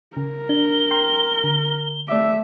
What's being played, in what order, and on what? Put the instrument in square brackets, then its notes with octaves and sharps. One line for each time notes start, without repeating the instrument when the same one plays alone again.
[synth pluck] C#3 [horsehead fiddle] A#4
[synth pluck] D4 [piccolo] G7
[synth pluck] G5 C6
D3
[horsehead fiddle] A3 E5 [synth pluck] D5 D6